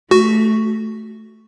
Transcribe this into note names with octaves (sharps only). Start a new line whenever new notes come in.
A3 F#4